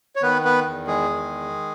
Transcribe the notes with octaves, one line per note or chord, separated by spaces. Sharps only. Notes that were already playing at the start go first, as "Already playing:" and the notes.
C#5
D#3 B3 B4
B3 B4
E2
G#3 G#4
D#3